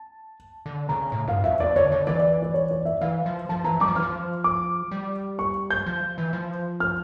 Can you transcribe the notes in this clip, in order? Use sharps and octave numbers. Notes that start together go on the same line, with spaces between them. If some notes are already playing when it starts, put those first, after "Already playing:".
Already playing: A5
D3
C#3 A#5
A2
G2 F5
F2 E5
F2 D5
D3 C#5
D3 D5
E3 D5
D5
D5
C#5
D5
E5
E3 F5
F3
F3 A5
E3 A#5
G3 D6
F3
E3 F6
F3
D6
G3
C#6
G6
F3
E3
F3
F6